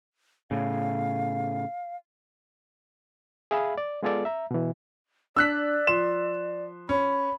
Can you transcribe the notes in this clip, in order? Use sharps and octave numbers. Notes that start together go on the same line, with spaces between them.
A2 C#3 F5
G#4 E5 F5 G#5 B5
D5
G#3 B3 F4 G#4 A4 D5
E5 A#5
B2 E3
D4 D5 E6 F#6 B6
F3 C6 E7
C#4 B5